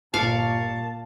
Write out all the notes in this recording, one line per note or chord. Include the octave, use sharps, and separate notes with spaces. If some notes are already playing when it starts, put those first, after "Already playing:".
G1 A#2 D5 F5 A5 C#6